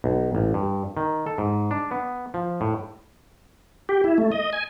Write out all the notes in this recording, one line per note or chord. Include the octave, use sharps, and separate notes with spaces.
B1
A1
G2
D#3
A4
G#2
D4
B3
F3
A2
G4
E4
A3
D#5
G#5